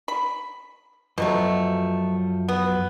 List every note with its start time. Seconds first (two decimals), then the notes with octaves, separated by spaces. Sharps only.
0.08 B5
1.18 F#2 B2 F3 F#3 A3
2.49 B3